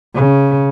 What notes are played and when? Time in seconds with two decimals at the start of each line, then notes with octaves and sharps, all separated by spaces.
0.16 C#3